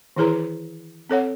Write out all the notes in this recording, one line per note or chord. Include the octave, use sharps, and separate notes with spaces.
D#3 E3 E4 G#4 B4 A#5
C4 A4 C#5 F#5